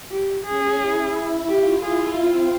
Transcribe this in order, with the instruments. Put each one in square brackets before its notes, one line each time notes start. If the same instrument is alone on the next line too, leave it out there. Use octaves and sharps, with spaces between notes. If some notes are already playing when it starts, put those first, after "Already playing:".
[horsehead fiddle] G4
[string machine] C#4 [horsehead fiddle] G#4
[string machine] E4
E4
[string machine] F4 [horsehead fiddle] G4
[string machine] E4 [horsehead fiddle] G#4
[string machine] C4 [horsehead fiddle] F4